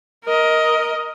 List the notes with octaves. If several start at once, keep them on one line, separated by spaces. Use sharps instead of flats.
A#4 D#5